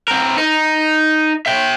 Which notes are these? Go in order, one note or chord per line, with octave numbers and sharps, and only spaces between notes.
C4 A#4
D#4
E5 G5